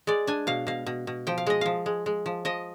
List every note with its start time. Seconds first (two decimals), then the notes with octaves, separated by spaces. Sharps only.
0.07 G#3 D5
0.27 D4 G#5
0.47 B2 F5
0.67 B2 F5
0.86 B2
1.07 B2
1.27 F3 G5
1.38 F5
1.47 G#3 D#5
1.61 F3 F5
1.86 G#3
2.06 G#3
2.26 F3
2.45 F3 D#5